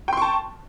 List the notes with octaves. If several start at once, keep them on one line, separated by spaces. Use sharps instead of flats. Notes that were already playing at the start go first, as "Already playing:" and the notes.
G5 A5 C6 C#6